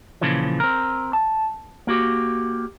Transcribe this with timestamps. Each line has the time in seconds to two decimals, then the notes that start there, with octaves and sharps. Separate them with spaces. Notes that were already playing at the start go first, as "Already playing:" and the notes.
0.21 A#2 C#3 E3 F3
0.60 C4 A#4
1.13 A5
1.87 A#3 F#4 G4